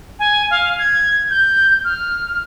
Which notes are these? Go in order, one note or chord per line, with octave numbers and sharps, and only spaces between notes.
G#5
F5
G#6
G6
F6